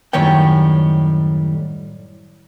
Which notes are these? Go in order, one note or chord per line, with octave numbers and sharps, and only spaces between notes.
F#2 A2 D#3 G3 C#5 G5